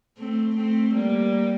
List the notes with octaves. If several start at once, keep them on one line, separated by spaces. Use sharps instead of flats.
A3 C4
A3 C4
G3 A#3